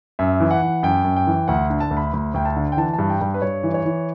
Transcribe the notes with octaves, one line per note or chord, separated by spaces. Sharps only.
F#2 E5
E3
F#5
E3
F#2 G5
F#2
G5
E3
D2 F#5
D3
A5
D2
B5
D2
D2 G5
A5
D3
G5
E3 A5
A5
G2
G5
G2
B4
G2 C#5
E3
C#5
E3